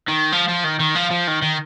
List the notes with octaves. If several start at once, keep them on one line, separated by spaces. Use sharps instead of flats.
D#3
F3
F3
D#3
D#3
F3
F3
D#3
D#3